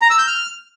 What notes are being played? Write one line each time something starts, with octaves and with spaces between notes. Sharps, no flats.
A#5
E6
G6
F6